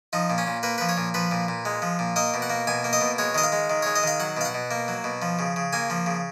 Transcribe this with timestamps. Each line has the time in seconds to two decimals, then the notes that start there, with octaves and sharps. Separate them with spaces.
0.13 F3 D#4
0.30 A#2
0.38 C#4
0.47 A#2
0.63 A#3 B4
0.78 F3 B4
0.89 C#5
0.97 A#2
1.14 F3 B4
1.31 A#2
1.48 A#2
1.65 G#3
1.82 F3
1.99 A#2
2.16 A#3 D#5
2.34 B2
2.42 F#5
2.50 A#3
2.67 B2 G#5
2.84 A#3
2.93 D#5
3.01 B2
3.18 G#3 C#5
3.35 D#3 D#5
3.43 F5
3.52 G#3
3.70 D#3
3.82 G#3 C#5
3.95 D#5
4.03 D#3 F5
4.20 F#3 F#5
4.37 B2 F5
4.45 F#5
4.54 B2
4.71 A#3
4.88 F#3
5.04 B2
5.22 F3
5.39 C#3
5.56 C#3
5.73 A#3 G#5
5.90 F3
6.06 C#3